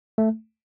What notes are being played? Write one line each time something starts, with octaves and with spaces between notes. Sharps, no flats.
A3